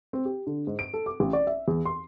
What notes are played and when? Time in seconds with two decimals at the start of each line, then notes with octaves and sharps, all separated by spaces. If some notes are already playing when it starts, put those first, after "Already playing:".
0.13 C4
0.25 G4
0.47 D3
0.67 G#2
0.79 D7
0.94 A4
1.06 D6
1.20 A1
1.33 D5
1.47 E5
1.68 E2
1.86 C6